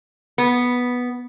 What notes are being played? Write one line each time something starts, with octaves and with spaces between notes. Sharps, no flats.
B3